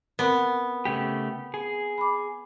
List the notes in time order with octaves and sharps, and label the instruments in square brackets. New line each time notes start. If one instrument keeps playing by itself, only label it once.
[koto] B3 [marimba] C4 A#4
[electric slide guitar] C#3 A3 G4
G#4
[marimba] B5 D6